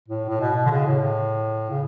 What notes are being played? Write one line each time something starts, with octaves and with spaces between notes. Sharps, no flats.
A2
A2
B2
B2
D3
C#3
A2
C#3